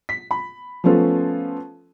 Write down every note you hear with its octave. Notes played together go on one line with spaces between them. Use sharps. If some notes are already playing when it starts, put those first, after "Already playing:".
B6
B5
F3 A3 B3 C#4 F4 A4